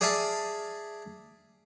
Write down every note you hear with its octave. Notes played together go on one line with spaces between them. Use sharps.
G#4 D5 E5 F5 G#5 A5